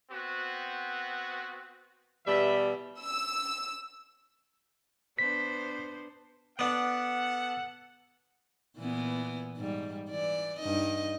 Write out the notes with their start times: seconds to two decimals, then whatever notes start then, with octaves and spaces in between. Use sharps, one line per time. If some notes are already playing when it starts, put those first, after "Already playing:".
0.11 B3 C4 F#4
2.26 B2 E3 G3 E5
3.01 E6
5.19 B3 D4 C5 B6
6.59 B3 D4 A4 F#5
8.77 A#2 E3 B3
9.56 G#2 G3
10.10 E3 D5
10.59 G2 D#4 D#5